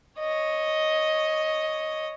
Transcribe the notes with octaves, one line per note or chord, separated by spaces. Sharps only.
C#5 D#5